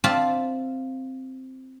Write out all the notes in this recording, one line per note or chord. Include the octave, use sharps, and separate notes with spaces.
C4 F4 D5 E5 A5